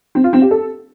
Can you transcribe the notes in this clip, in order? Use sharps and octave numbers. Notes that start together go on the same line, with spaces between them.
C4
F4
C4
G4
A4